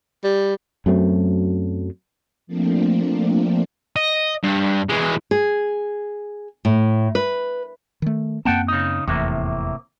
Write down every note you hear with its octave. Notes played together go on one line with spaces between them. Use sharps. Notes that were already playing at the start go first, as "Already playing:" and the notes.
G3
F#2 F#3 A3 C4
F3 A3 A#3 C4 D4
D#5
G2
E3 G#3
G#4
A2
B4
D#3 A3
F#2 A#3 C4 F#5 G5 A5
C#3 D#4
F1 E2 A2 C3 A#3